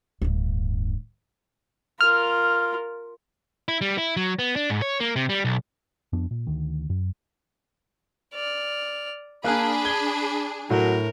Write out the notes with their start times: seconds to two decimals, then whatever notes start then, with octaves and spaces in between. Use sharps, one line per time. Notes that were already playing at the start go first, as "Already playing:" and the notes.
0.22 D1 G2
2.01 F4 A#4 F6
3.68 E4
3.81 G3
3.98 E4
4.17 F#3
4.39 B3
4.56 D4
4.70 G#2
4.82 C#5
5.00 A#3
5.16 C3
5.29 G3
5.45 B1
6.13 F2 B3 D4
6.31 A#2
6.47 D2 D#3
6.90 F#2
8.34 D5 F6
9.44 A#3 D4 G#4 B5 F#6
9.85 G#6 G7
10.70 A2 F#3 A#4